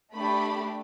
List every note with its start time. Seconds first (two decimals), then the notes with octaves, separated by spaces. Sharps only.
0.14 A3 D4 G4 B5